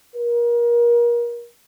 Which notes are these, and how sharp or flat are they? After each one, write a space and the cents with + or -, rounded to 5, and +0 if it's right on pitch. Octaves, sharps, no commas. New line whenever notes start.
A#4 +30